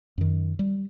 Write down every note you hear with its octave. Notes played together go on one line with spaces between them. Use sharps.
F#2 D#3
G3